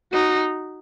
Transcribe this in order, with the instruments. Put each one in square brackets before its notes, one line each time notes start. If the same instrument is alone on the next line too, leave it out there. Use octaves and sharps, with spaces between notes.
[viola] D#4 [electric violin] F#4